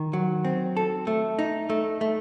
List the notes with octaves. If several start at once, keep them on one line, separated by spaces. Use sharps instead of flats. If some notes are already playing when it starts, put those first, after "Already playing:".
Already playing: D#3
F#3
C4
A4
A3
D#4
A3
A3